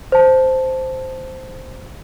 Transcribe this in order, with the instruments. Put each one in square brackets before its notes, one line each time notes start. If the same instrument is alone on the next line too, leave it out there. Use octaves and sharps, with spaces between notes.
[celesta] C5 A5